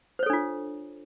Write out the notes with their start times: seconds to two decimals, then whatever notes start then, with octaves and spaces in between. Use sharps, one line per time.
0.19 C5
0.23 C#5
0.26 A4
0.30 D4
0.33 F4